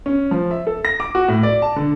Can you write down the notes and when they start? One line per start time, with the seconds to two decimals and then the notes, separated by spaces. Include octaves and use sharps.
0.06 C#4
0.31 F3
0.51 E5
0.67 A4
0.85 A#6
1.00 D6
1.15 F#4
1.28 A2
1.43 D5
1.62 A5
1.76 D3